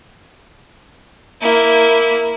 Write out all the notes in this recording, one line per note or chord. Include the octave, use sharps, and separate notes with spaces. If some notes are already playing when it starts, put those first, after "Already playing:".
A#3 E4